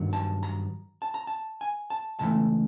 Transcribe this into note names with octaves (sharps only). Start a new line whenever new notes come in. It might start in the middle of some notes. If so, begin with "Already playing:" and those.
Already playing: G2 D#3 F#3
A5
A#5
A5
A#5
A5
G#5
A5
C#2 C#3 E3 A3 A5